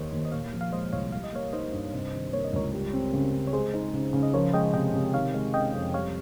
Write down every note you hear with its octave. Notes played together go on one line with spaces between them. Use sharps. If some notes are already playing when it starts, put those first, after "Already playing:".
Already playing: D#2 D#3 A#3 C5 C#5 D#5
D#2
D#5
A#2 C#5 F5
F3
F5
G#3 C5 D#5
C2 C#5 F5
G3 F5
D#5
A#3 C#5 F5
D#4 C5 D#5
G2
C3
D#3
A#3 C#5
D#5
C#2 A#4 C#5
G3
C4
C#3
C#3
C#5
G#3 G#4 C5
D#4
C#3
C#3
D#5
F3 A#4 C#5
G#3 D#5 G5
C3 D#5 G5
C3
D#3 C#5 F5
G#3
C#4 D#5 G5
F2
G3 C#5 F5